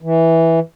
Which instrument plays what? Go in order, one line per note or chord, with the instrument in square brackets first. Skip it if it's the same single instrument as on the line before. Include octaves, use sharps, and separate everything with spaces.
[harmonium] E3